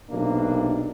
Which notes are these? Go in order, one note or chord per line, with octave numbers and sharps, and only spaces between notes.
B1 C3 A#3 D4